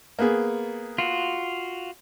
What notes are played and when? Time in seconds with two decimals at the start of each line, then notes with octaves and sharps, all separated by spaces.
0.19 A#3 B3 G#4
0.98 F4 F#4